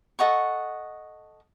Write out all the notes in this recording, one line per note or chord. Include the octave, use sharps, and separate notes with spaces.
A4 D#5 F#5 C#6